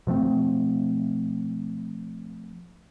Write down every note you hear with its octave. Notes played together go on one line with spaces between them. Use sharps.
B2 F3 A3 C4